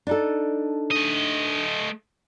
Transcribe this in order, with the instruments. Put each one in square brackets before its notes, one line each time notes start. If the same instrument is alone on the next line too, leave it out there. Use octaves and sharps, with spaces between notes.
[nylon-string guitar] D4 D#4 A4
[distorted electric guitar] A3 D#5